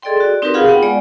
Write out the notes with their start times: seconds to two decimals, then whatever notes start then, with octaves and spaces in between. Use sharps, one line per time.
0.02 G#4 A4 D5 D#5 G5 C6
0.17 F#4 D5
0.42 C4 D#4 F#4 G4 A#4 B4
0.53 F4 G#4 F5 F#5 B5 D#6
0.66 B3 F#5 G5
0.82 G#3 D5